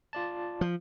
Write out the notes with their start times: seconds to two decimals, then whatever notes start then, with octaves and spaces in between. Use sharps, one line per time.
0.13 F4 D5 A5
0.61 F3